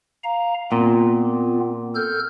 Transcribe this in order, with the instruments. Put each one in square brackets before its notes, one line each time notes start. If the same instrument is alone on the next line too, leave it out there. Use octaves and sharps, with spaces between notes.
[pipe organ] F5 A#5
[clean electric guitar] A#2 [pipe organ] B3 C4 F4
[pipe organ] A4 F6 G6